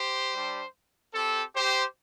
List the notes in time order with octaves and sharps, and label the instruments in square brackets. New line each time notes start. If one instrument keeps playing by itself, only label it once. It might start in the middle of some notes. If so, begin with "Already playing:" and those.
Already playing: [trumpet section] G4 C5
G3 D4 G4
C4 G4 A4
G4 C5